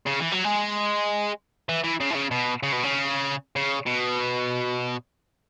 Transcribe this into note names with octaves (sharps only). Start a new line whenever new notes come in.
C#3
E3
F#3
G#3
E3
E3
C#3
E3
C#3
B2
C#3
B2
C#3
C#3
B2